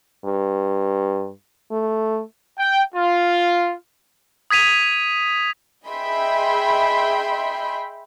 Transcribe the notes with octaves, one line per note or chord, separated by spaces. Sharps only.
G2
A3
G5
F4
D#6 G#6 B6 D#7 F7
G#4 D#5 E5 G5 B5 C6